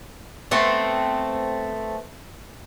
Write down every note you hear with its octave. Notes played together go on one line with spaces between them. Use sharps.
A3 B3 C4 A4